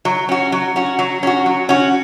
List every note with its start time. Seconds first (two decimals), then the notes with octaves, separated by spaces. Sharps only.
0.05 F#3
0.29 C#4 F#4
0.52 F#3
0.76 C#4 F#4
0.99 F#3
1.23 C#4 F#4
1.46 F#3
1.69 C#4 F#4